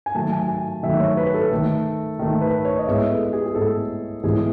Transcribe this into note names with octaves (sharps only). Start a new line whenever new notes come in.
G#5
D#3 F#3 A3 A5
G#5
G#5
D#3 F#3 A3 E5
C#5
B4
A4
D#3 A3
D#3 A3
B4
C#5
D#5
A2 G#3 B3 E5
A4
G#4
G#4
A2 G#3 B3 A4
A2 E3 G#3 B3 G#4